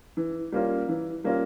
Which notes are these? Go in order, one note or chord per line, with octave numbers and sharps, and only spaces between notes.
E3
G3 A#3 C#4 F4
E3
G3 A#3 C#4 F4